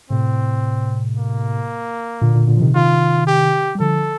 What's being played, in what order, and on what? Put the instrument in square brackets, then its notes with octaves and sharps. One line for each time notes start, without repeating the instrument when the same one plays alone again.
[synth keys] A2 C3 [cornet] C4
[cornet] A#3
[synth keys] A#2 D3
A#2 D3
A#2 D3
F3
C3 D#3
[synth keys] C3 D#3 [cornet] F4
[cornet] G4
[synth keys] G3
[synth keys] D3 F3 [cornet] A4